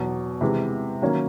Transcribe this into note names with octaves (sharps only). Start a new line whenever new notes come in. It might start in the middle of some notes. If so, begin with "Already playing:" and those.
Already playing: E2 B2 F#3
C3 E3 G#3
D#3 F#3 A#3 C#4